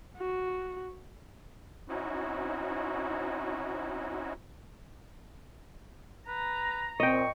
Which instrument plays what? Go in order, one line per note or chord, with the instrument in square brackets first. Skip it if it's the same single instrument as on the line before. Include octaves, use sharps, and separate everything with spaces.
[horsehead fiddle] F#4
[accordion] C4 C#4 D#4 E4 F#4
[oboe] B4 [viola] A#5
[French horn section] A#2 C4 [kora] D#5 G5 [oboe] C#6